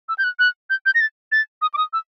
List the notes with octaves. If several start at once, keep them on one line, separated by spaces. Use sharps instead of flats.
E6
G6
F#6
F#6
G6
G6
A#6
A6
A6
D#6
D6
D#6
E6